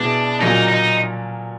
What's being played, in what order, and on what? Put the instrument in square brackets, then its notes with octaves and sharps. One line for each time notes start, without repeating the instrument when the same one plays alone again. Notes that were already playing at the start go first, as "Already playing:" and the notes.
Already playing: [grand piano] B2 G#3 B3 E4 [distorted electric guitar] D4
[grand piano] A#2 F#3 A#3 C#4 [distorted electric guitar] D#4
[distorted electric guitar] D#4